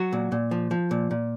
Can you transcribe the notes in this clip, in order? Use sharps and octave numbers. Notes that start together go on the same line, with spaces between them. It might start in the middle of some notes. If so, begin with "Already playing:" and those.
Already playing: F#3 F#4
A#2
A#2
F3
F3
A#2
A#2